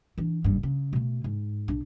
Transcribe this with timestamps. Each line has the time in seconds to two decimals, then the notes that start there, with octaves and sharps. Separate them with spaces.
0.18 E3 D4
0.44 F#1 G2
0.63 C#3
0.93 B2 A3
1.24 G#2
1.68 B1 D4